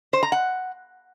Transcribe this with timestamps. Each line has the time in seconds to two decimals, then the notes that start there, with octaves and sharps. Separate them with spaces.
0.13 C5
0.23 A#5
0.32 F#5